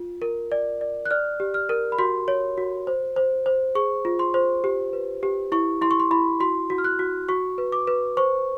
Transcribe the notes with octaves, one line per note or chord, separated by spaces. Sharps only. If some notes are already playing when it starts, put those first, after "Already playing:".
Already playing: F4
A#4
D5
D5
F#6
D5 F6
G4
F6
A#4
B5
F#4 C6
C#5
F#4
C5
C5
C5
G#4 C#6
F4
C6
C5
G4
B4
G4
E4 C#6
E4 C6
C#6
C6
E4 B5
F#4 C6
F#4
F6
F#6
F#4
F#4 C#6
B4
D6
B4
C5 C#6